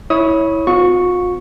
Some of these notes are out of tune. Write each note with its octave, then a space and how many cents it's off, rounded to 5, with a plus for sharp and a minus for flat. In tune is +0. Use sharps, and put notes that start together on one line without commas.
E4 -15 C#5 +0 D#6 +30
C4 -35 F4 +45 C#6 +0